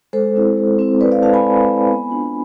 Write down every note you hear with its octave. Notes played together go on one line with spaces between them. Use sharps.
G#3 A4 C5
C4 E4
G#3
C4 E4
G#3 B4 D5
D5 F5
C4 E4 F5 A5
G#5 B5
G#3
C4 E4
B3
D4 F4